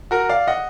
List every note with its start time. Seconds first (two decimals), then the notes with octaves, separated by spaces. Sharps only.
0.11 F#4 A#4
0.29 D5 F5
0.47 D#5 F#5